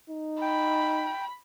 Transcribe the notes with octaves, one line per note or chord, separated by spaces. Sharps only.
D#4
G5 B5